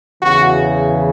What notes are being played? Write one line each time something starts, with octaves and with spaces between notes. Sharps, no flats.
E2 C#3 E3 F#4